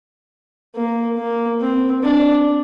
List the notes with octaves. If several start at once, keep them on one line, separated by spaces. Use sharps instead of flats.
A#3
A#3
C4
D4